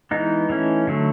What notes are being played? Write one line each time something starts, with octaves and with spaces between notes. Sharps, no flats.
E3 G#3 B3 D#4
E3 A3 C#4
D3 F#3 A3